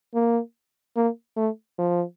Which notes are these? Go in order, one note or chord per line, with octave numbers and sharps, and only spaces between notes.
A#3
A#3
A3
F3